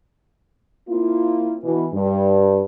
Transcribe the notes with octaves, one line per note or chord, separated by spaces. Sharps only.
A#3 C4 E4 F4
B2 E3
G2